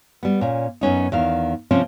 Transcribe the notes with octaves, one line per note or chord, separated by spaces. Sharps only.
G3 B3
A#2 C#4
F#2 B3 C#4 D#4
E2 D#3 F5
C3 F3 C4 C#4